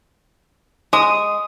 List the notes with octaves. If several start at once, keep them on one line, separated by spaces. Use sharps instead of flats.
G#3 D#6